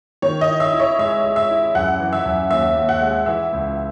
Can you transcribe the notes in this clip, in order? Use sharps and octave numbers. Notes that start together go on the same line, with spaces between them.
D#3 C#5
D#5
E4
E5
E4
C#5
G#3 E5
G#3
E5
E4
F#2 F#5
E3
E5
F#2
D#2 E5
D#2
F#5
G#3
E3 E5
C#2